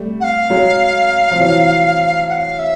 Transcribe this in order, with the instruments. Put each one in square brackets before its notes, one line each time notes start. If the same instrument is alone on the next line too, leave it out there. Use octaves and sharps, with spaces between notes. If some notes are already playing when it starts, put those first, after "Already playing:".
Already playing: [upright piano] G3 A3
[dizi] F#5
F5
[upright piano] F#3 G#3
F3
E3 F#3
[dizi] F#5
F5
E5